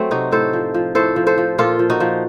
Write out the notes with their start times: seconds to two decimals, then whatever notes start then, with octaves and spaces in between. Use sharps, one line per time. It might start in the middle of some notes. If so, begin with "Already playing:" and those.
Already playing: F#3 A3 C4
0.11 C3 D#4 F#4
0.31 A2 A4 C5
0.53 F3
0.74 F3
0.95 A2 A4 C5
1.16 F3
1.27 A4 C5
1.38 F3
1.58 A#2 F4 A4
1.79 F3
1.90 D#4 F#4
2.00 F3